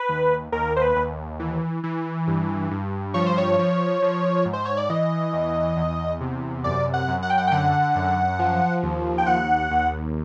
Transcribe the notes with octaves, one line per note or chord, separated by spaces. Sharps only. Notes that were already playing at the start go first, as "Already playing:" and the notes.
Already playing: B4
D#2
D#2 A#4
C5
B4
D#2
E3
E3
G2
G2
F3 C#5
C5
C#5
F3
F3
G#2
C5
C#5
D5
E3 D#5
E2
E2
C3
F#2 D5
F#5
F#2
F#5
G5
F#5
G5
D3 F#5
F#2
F3
D#2
G5
D#2 F#5
D#2